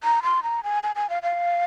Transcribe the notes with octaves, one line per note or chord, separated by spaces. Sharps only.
A#5
C6
A#5
G#5
G#5
G#5
F5
F5